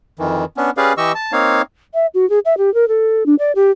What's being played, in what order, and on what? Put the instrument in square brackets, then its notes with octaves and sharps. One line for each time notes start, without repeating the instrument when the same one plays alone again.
[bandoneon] F2 D#3 E3
B3 C#4 D4
C#4 G4 G#4 B4 D5 F5
E3 G4 D#5 C#6 E6
A5
A#3 C4 D#4 C#5 F5
[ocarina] E5
F#4
G#4
E5
G4
A#4
A4
D4
D5
G4